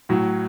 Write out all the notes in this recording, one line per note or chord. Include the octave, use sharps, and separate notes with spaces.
A2 F#3